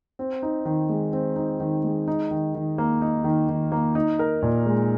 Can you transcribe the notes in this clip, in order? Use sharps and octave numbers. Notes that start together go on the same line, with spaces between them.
C4
D#4
D#3
G#3
C4
D#4
D#3
G#3
D#4
D#3
D#3
A#3
D#4
D#3
D#3
A#3
D#4
A#4
A#2
G#3